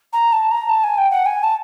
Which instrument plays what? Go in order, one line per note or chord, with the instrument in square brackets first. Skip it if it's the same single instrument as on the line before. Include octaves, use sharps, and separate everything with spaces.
[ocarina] A#5
A5
A#5
A5
G#5
G5
F#5
G#5
A5